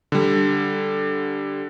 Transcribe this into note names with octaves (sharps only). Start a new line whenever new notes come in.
D3 G3